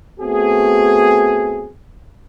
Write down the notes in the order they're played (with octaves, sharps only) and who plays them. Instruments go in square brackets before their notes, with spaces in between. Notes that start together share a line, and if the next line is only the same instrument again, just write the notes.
[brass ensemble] A3 B3 C4 F#4 G#4